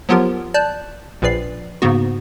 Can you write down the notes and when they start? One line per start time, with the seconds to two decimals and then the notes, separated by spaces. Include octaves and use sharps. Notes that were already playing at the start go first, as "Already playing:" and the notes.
0.09 F3 F#3 B3 F4 G4 A#4
0.54 D5 A5 F#6 G6
1.22 A#1 A#2 B4 D5 C7
1.82 G#2 C#3 A#3 B3 F#4